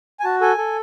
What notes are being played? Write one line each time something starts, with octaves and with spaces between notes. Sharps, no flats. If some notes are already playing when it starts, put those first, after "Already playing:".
G#5
F#4 A5
A4 G#5
A4